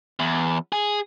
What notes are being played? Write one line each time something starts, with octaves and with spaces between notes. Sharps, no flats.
E2
G#4